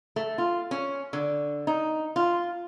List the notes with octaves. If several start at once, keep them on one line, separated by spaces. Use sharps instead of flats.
A3
F4
C#4
D3
D#4
F4